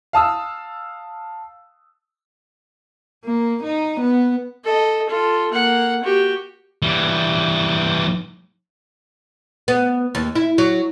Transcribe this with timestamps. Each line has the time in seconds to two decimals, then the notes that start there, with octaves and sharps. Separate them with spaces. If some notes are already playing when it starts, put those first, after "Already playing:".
0.13 F5 A5 D#6 E6
3.24 A#3
3.63 D#4
4.00 B3
4.64 A4 D#5
5.09 F4 A4
5.52 A#3 F#5
6.04 F#4 G4
6.82 E3 G3
9.68 B3
10.15 D#2
10.35 E4
10.58 F#3